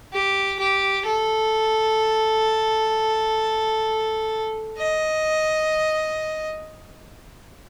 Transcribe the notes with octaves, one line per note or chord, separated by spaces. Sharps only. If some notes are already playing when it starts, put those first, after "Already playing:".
G4
G4
A4
D#5